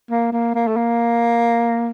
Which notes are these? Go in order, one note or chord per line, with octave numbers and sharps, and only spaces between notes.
A#3
A#3
A#3
A3
A#3